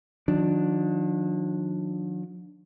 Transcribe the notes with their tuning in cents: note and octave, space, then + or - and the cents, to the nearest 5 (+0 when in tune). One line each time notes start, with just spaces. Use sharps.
D#3 +0 F#3 -45 D4 +0